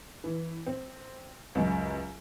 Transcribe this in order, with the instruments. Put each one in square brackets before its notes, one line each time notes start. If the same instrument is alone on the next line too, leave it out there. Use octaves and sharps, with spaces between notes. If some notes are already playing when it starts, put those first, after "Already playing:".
[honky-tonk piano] E3
C4
C#2 F#2